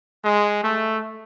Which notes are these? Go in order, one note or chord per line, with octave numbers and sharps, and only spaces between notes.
G#3
A3